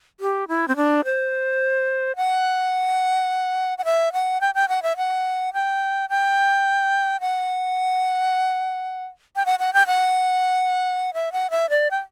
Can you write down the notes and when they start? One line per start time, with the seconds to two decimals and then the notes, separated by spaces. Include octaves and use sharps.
0.20 G4
0.48 E4
0.68 C4
0.76 D4
1.05 C5
2.16 F#5
3.78 F#5
3.85 E5
4.13 F#5
4.41 G5
4.55 G5
4.68 F#5
4.83 E5
4.97 F#5
5.53 G5
6.09 G5
7.20 F#5
9.36 G5
9.46 F#5
9.59 F#5
9.74 G5
9.87 F#5
11.14 E5
11.32 F#5
11.50 E5
11.70 D5
11.91 G5